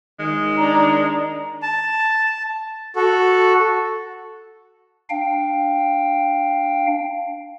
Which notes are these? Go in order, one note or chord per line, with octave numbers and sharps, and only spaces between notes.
D#3 G#3
D4 A#5
A5
F#4 A4
D4 F5 G5